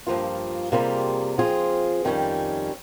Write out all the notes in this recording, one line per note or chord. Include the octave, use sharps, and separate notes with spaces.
G2 F3 A#3 F4
C3 G3 A#3 F4 G#4
F3 C4 F4 G#4
F2 D#3 G3 C#4